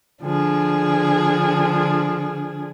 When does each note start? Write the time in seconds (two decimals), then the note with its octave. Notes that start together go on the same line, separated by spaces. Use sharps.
0.23 D3 F3 D4 G#4